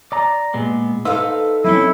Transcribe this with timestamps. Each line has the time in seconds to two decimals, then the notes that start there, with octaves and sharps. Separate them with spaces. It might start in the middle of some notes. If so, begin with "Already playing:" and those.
0.12 D5 A#5
0.54 A#2 G#3 B3
1.05 D#4 A4 B4 C5 E5 F5
1.64 F#3 C4 C#4 E4